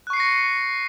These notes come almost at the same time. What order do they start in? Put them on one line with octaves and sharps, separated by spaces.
F#6 C#6 C7 C#7 A#6